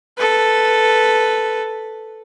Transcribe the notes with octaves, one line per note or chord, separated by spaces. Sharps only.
A4 B4